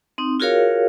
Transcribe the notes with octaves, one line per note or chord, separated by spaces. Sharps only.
C4 D#4
F4 F#4 G#4 A#4 C#5 F5